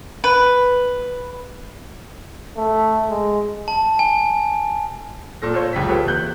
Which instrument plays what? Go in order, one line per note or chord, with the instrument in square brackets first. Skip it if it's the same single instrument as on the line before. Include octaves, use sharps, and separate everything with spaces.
[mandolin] B4
[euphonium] A3
G#3
[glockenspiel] A5
G#5
[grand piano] A#2 A4 A#6
F4 A4 C5 C#5
F1 C#2 F#3 F4 G5 B6
F4 G4 A4 B4 C#5
E2 C3 A#3 F#6 G6